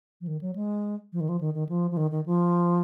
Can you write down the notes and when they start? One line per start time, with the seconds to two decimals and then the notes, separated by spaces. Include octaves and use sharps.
0.21 F3
0.27 D#3
0.41 F#3
0.56 G#3
1.13 F3
1.20 D#3
1.29 F3
1.41 D#3
1.54 D#3
1.69 F3
1.91 F3
1.97 D#3
2.11 D#3
2.26 F3